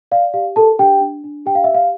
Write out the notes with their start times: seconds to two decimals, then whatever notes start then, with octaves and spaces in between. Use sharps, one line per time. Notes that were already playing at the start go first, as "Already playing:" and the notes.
0.11 D5 F5
0.34 G4 F5
0.56 A4 A#4 A5
0.79 D4 G4 G5
1.01 D4
1.24 D4
1.46 G4 G5
1.55 F5
1.64 E5
1.69 G4
1.74 F5